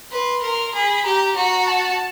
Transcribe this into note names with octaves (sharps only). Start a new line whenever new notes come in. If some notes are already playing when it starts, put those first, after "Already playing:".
B4 C6
A#4
G#4 B5
G4 A#5
F#4 A#5
A5